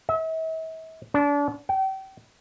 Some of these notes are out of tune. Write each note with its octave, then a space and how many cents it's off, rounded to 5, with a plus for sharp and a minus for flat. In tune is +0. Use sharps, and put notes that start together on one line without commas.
E5 -40
D4 -30
G5 -35